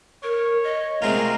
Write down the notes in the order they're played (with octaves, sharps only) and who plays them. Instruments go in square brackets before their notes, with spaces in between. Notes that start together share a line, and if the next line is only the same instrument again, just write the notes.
[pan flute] A#4 [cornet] C#5
[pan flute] D#5
[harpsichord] C3 G#3 F4 [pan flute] A3 [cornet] A#4